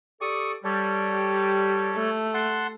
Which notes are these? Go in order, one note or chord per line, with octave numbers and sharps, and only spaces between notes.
G4 A4 D5 C#6 D#6
G3 A4 C#5
G4
A3
F#5 A5 C6